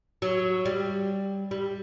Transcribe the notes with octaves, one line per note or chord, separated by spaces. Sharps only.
F#3
G3
G3